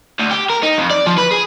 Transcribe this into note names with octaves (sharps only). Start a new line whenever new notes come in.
D2
G4
A#4
D#4
F2
D5
F3
B4
G#4